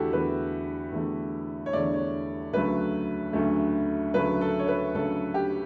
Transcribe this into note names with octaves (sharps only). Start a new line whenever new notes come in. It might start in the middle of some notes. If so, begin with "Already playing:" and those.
Already playing: E2 D3 A3 E4 F#4 G4 A4
E2 D3 A3 B4
E2 D3 A3
C#5
E2 D3 A3 D5
C#5
D2 C#3 F#3 A3 B4
D2 C#3 F#3 A3
D2 C#3 F#3 A3 B4
A4
C#5
B4
D2 C#3 F#3 A3 A4
G4